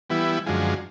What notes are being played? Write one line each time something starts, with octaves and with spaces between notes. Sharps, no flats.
E3 G3 B3 E4
F#2 D3 F3 G#3